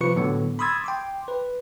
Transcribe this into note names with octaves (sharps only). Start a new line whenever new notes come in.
C3 F3 F4 B4 C#6 C#7
A2 D3 F#3 B3
B5 C6 D#6 E6 G#6 A6
G5 C6 D6
B4